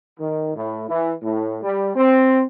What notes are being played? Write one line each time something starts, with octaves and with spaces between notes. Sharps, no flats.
D#3
A2
E3
A2
G3
C4